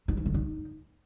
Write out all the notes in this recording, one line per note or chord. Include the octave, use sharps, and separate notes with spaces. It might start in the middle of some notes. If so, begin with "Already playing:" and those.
D#4
C#4
D3
D#4